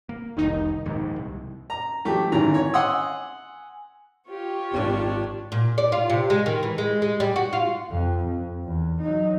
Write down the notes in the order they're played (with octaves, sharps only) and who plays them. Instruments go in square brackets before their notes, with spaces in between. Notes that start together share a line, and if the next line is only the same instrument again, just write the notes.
[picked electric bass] A#3
[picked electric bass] F1 C2 [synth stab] D#3 D#4
[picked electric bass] A#1 D#2 G#2
C2
[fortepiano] A#5
E3 F#3 A3 G4
G#1 D#3 E3 G#5 A#5
C#5
F#5 G#5 C6 D#6 E6
[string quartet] F4 G4 C#5
[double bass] G#1 D4
[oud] A#2
D5
F4
C3
G#3
D#3
E3
G#3
G#3
G3
F#4
F4
[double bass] F2
F2
E2
F#3 D#4